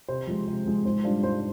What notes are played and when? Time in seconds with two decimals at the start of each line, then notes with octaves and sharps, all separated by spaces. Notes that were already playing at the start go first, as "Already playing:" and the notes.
0.09 C3 C5
0.27 F3 G#3
0.48 C3
0.66 F3 G#3
0.85 G#2 C5
1.04 G3 D4 F4 C5
1.23 G#2 C5